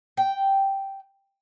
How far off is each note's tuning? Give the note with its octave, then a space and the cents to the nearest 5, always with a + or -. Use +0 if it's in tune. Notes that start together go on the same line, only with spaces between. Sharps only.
G5 -5